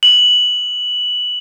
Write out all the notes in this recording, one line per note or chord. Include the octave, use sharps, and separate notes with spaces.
F#7